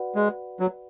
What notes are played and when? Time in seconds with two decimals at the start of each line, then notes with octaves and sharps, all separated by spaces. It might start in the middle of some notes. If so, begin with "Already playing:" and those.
Already playing: F#4 B4 D5 F#5 B5
0.15 G#3
0.60 F#3